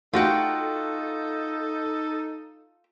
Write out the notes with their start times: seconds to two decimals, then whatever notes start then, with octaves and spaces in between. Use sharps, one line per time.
0.13 A3 D#4 F4 F#4 A4 F#5 G5